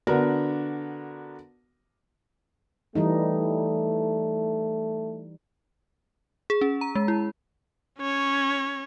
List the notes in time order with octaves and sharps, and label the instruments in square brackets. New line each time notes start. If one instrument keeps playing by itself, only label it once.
[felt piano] D3 B3 D4 F#4 A#4
[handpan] E3 G3 D#4 [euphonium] A3
[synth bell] G#4
C#4
A#5
G#3
E4
[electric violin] C#4 C#5